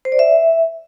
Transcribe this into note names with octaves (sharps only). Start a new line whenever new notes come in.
C5
D5
E5